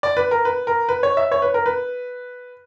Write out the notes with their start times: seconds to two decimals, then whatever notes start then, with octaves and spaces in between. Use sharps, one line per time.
0.03 D5
0.17 B4
0.31 A#4
0.45 B4
0.67 A#4
0.89 B4
1.03 C#5
1.17 E5
1.32 C#5
1.42 B4
1.54 A#4
1.66 B4